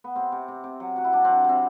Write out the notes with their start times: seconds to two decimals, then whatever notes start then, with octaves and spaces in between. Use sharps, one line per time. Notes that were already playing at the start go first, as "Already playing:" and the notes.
0.04 B3
0.16 C3 C4
0.32 C3
0.48 C3
0.64 C3
0.80 F#3
0.96 F#3 F#4
1.05 E4
1.13 F#3 D4
1.25 F#3 C4
1.44 C3 C4